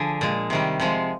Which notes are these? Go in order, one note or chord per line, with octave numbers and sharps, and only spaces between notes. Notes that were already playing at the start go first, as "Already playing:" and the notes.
Already playing: D3 F3 G#4
A#2 G#3
C3 D#3 G3
C3 F3 G#3